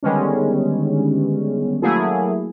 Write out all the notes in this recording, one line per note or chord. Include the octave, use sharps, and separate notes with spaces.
D3 D#3 G3 G#3 B3 C#4
F#3 A3 A#3 E4 G#4